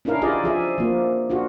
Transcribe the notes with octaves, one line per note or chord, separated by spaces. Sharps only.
C#4 D4 E4 A#4 F5
E4 F4 G4 G#4 D5 D#5
F3 G#4 E5
F3 A#3
D4 F4 F#4